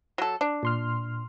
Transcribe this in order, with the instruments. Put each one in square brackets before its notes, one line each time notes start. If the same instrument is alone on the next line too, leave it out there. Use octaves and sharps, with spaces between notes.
[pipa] F#3 A4
D4
[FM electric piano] A#2 C6 F6